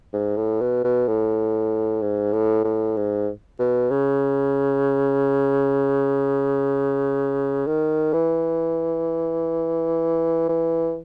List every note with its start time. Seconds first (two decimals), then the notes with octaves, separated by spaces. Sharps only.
0.13 G#2
0.37 A2
0.61 B2
0.84 B2
1.08 A2
2.02 G#2
2.33 A2
2.64 A2
2.97 G#2
3.59 B2
3.91 C#3
7.67 D#3
8.14 E3
10.49 E3